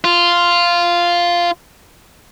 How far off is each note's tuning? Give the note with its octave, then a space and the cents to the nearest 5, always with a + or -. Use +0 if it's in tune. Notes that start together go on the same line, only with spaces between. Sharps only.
F4 -5